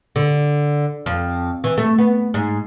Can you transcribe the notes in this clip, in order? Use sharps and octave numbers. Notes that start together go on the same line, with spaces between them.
D3
F2
E3
A3
B3
G#2